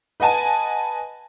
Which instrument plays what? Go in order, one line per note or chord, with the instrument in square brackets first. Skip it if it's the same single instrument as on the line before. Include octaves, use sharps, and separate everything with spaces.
[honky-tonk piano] B4 D#5 F#5 G#5 A5